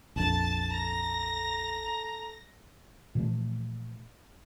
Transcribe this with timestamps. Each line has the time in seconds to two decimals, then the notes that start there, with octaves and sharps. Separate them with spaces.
0.16 A#1 F2 A5 A6
0.72 A4 A#5 A#6
3.15 A#2 E3 F3 A3